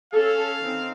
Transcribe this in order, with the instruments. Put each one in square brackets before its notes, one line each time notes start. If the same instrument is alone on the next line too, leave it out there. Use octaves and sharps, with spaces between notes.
[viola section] C#4 A4 [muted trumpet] F5
[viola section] D#3 C4